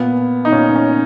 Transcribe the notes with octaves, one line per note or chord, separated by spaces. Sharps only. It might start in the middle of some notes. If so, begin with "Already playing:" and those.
Already playing: A#2 B3
D#4
A#2 C#4
C#4